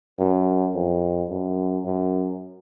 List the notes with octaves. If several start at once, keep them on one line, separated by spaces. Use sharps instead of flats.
F#2
F2
F#2
F#2